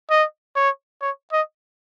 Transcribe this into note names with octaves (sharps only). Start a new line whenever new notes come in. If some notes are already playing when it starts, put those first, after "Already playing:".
D#5
C#5
C#5
D#5